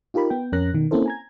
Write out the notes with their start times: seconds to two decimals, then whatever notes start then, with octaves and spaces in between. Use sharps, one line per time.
0.14 D#4 F4 G4 A#4 B5
0.30 B3 G5
0.52 F2 C#4 A#4 F#6 A#6
0.74 B2 D#3
0.91 A#3 C4 C#4 E4 A4 C5
1.06 G#5 A#5 G#6